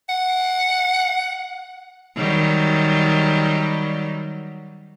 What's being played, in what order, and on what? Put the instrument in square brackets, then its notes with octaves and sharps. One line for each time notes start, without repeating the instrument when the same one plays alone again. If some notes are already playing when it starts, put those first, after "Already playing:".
[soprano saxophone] F#5
[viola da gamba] D#3 F#3 G3